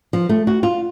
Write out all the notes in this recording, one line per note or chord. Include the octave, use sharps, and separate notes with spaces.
F3
A3
F#4
F4